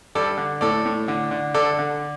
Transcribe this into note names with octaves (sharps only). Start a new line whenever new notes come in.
G2 A4 D5
D3
A2 A4 D5
A2
D3
D3
D3 A4 D5
D3